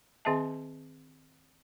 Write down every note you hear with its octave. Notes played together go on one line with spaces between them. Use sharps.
D#3 C4 G#4 D#5 E5 A5